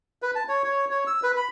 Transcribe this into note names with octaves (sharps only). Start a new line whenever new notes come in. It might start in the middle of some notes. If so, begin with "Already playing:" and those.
B4
A5
C#5
C#5
C#5
E6
B4
B5